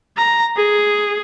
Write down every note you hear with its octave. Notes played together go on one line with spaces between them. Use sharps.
A#5
G#4